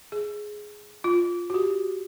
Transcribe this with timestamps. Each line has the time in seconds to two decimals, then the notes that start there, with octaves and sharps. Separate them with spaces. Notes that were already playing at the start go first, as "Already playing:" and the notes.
0.12 G#4
1.04 F4
1.50 F#4 G4